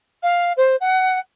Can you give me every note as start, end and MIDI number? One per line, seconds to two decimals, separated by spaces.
0.22 0.52 77
0.57 0.76 72
0.80 1.19 78